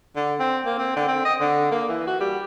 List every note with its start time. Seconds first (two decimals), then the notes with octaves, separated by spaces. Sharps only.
0.16 D3
0.40 C4
0.66 A#3
0.78 C4
0.96 D3
1.08 C4
1.25 D#5
1.40 D3
1.71 A#3
1.89 E3
2.07 F#4
2.21 G3